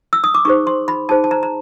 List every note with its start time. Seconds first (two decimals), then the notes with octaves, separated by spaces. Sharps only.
0.13 E6
0.24 D#6
0.34 D6
0.45 D#4 G#4 C5 C#6
0.67 C6
0.88 B5
1.09 D#4 G#4 C5 A5
1.24 A5
1.31 A#5
1.43 A#5